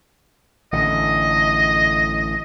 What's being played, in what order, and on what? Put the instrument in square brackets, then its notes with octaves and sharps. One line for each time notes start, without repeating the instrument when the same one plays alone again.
[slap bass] A1 D3 [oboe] D#5